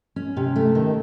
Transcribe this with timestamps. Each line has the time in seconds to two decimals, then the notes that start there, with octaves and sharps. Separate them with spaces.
0.16 C#4
0.37 C3
0.56 A3
0.75 D#3